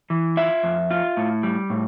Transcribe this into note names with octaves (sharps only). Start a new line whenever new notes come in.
E3
F4 E5
F2
F4
A2
G3
A2